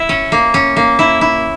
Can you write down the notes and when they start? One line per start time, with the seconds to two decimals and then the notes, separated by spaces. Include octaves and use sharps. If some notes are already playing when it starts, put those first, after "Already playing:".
Already playing: E4
0.09 C#4
0.32 A#3
0.54 C#4
0.76 A#3
0.99 E4
1.21 E4